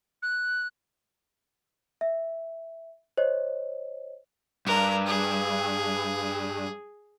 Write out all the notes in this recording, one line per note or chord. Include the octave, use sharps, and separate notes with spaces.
F#6
E5
C5 C#5 D#5
G2 A#4
G#4